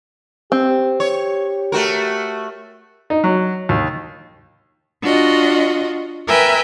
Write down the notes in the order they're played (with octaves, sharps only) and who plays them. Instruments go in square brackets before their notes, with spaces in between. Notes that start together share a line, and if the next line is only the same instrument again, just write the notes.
[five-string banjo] C4 [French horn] G4
[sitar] C#5
A3 F#4 A#4
[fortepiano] D#4
F#3
D#2
[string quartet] D4 F4 F#4 D#5
A#4 B4 E5 G5 G#5